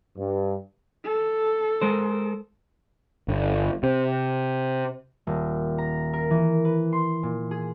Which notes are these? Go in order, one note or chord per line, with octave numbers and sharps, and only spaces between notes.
G2
A4
G#3 A#4 C5
G1
C3
D#1
A#5
A#4
E3
B4
C6
A#2
G#4